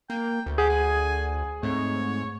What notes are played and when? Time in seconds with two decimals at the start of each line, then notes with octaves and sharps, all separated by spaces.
0.10 A#3 G5
0.46 D2
0.58 G4 G#4 F#5
0.70 G#5
1.63 G#2 A3 C4 C#5